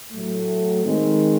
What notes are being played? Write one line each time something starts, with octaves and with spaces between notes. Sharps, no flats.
A2 F#3 A3
D#3 G#3 C4